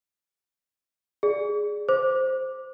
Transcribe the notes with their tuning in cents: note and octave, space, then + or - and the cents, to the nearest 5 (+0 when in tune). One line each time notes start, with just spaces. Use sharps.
G#4 +0 D5 +0
C5 +0 D6 +0